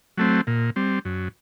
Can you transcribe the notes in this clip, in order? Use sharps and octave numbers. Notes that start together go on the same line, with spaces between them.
F#3 A3 C4
A#2
G3 C4
F#2